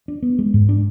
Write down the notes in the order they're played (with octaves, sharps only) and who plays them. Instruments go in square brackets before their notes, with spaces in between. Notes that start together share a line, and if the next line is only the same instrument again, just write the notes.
[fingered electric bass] D4
B3
G#3
G#2
D4